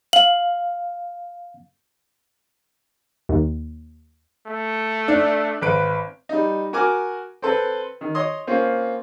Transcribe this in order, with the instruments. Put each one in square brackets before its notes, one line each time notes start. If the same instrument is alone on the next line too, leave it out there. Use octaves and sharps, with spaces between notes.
[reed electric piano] F5 [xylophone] F#7
[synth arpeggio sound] D#2
[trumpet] A3
[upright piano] D4
G#1 B4 D7
[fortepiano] G3 D#4
F#4 A#4 G#5 D6 F6
C4 A4 B4
D#3
C#5 D#5 C6 D#6
A#3 C4 C#4 F4